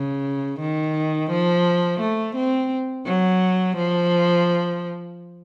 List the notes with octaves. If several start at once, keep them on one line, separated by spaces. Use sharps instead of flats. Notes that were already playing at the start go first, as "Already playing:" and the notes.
Already playing: C#3
D#3
F3
A3
C4
F#3
F3